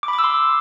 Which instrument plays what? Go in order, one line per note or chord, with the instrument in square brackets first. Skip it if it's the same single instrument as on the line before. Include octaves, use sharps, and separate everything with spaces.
[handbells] D6
B5
D6
E6
C6